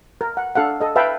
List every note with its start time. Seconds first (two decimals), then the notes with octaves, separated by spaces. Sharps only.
0.21 A#4
0.37 F#5
0.55 D4 A4 F5 F#5
0.81 A4 D#5
0.96 B4 E5 F5 G5 A5 B5